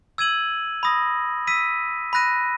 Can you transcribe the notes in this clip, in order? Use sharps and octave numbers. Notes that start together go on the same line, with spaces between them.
E6 G#6 D#7 F#7
B5 D#6 A#6
E6 B6 D#7
B5 F#6 A#6 D#7